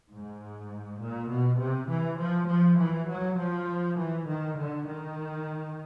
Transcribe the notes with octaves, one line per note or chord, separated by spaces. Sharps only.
G#2
A#2
B2
C3
E3
F3
F3
E3
F#3
F3
E3
D#3
D3
D#3